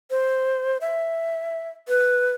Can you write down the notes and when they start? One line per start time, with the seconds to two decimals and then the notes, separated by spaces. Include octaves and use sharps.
0.11 C5
0.81 E5
1.88 B4